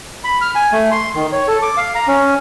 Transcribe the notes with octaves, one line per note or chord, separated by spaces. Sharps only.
B5
F6
G#5
A3
C6
D#3
C#5
A4
D6
F5
A#5
C#4